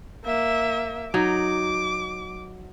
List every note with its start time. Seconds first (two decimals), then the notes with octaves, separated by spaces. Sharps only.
0.25 A#3 E5
1.14 F#3 D#4 D6